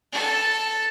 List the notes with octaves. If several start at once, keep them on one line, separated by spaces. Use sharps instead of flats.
A4 A5